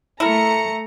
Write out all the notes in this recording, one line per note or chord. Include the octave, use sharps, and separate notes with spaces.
A3 E4 A#4 A#5 C#7